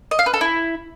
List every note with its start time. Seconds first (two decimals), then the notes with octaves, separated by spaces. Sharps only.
0.11 D#5
0.19 F5
0.26 B4
0.34 A4
0.41 E4